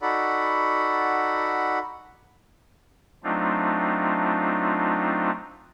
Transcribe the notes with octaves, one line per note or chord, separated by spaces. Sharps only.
D#4 F#4 A4 D5 F#5 B5
F#3 A3 C4 D4 D#4 F4